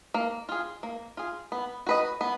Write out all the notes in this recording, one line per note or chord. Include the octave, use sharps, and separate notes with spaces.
A#3
F4 G#4
A#3
F4 G#4
B3
F#4 B4 D#5
B3